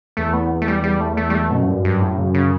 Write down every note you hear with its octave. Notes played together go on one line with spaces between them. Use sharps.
E2 A3
B3
A3
G3
G3
A3
A3
G3
A3
F#2 B2
A2
G2
G2
A2
C#3
C#3